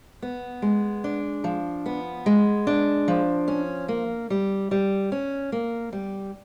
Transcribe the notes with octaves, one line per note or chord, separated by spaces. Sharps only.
B3
G#3
D4
F3
B3
G#3
D4
F3
C#4
A#3
G3
G3
C#4
A#3
G3